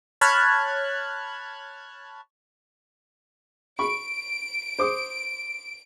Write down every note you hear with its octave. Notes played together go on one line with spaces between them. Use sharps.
C#5 A5 B5 F6 F#6 G#6
B5 C#6 D7
C5 D6 D#6